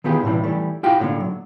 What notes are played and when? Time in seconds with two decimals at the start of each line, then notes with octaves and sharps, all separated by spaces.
0.04 D#3 E3 B3 F4 G4 G#4
0.23 A2 C3 E3 G3
0.44 E3 G3 A3
0.83 E4 F4 G4 F#5 G5
1.00 A2 D3 A3 A#3
1.20 F#3